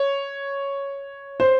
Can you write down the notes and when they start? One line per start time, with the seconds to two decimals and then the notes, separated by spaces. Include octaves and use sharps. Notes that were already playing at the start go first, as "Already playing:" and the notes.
Already playing: C#5
1.40 C5